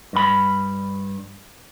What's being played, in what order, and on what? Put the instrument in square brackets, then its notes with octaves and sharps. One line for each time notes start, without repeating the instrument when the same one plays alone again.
[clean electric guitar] G2 B5